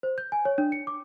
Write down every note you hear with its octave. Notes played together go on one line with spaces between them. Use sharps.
C5
G6
G#5
C#5
D4
C#7
D6